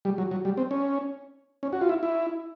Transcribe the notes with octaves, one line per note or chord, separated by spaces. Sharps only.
G3
F#3
F#3
G3
C4
C#4
C#4
F#4
F4
E4
E4